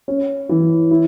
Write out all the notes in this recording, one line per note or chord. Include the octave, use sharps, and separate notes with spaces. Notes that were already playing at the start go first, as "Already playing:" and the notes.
C#4
E3
E4